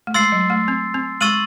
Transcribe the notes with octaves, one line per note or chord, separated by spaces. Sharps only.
A3
G#3 C6 E6 A6 C7
F#3
A3
C4
C4
G#3 C#6 E6 A6 D#7 F#7